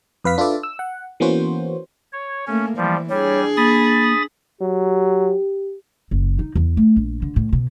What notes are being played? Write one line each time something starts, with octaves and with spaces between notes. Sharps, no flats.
F2 B4 F5 B6
D4 F4 A4 B4 D5 E5
E6
F#5
E3 A#3 B3 C#4 F#4 C5
C#5
A3 A#3 C#4
E3 F3 G3
G3 D4 G#4 C#5
A#3 B5 D#6 A6
F#3 G4
F#1
D#4
E2
A3
A#1
D3
A2
B2